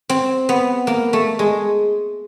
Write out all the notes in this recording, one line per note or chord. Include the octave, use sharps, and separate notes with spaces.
C4
B3
A#3
A3
G#3